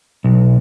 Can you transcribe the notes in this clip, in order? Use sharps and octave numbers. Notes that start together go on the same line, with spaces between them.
B1